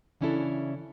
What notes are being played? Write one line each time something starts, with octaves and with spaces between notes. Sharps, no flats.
C#3 E3 C#4 D4 E4 A4